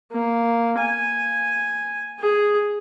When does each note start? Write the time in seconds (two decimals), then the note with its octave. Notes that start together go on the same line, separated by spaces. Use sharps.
0.12 A#3
0.79 G#5
2.20 G#4